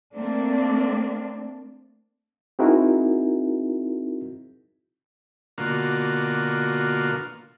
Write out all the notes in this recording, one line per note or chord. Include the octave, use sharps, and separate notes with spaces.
A3 A#3 C4 D4
C4 D#4 E4 F#4 G#4 A#4
B2 D3 A#3 F4 F#4